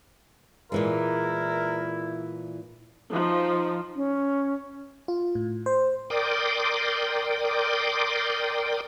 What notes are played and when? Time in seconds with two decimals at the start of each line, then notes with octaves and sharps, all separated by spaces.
0.72 A#2 E3 G#3 E4 A#4
3.12 F3 D#4
3.96 C#4
5.08 F4
5.35 A2
5.66 C5
6.10 A#4 D5 G5 C6 D6 D#6